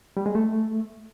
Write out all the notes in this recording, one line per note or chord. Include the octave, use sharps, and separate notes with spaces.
G3
G#3
A3